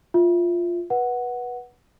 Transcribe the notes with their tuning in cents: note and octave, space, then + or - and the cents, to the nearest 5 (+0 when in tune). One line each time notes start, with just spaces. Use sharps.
F4 +0 E5 +0
B4 -20 F#5 +0